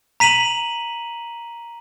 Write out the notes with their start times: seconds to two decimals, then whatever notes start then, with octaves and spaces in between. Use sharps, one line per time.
0.20 A#5 B6 D#7 F7 F#7